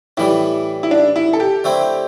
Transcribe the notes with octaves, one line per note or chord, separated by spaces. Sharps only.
A2 E3 G3 E4
E4
D4
E4
A4
G4
D3 A3 C4 E4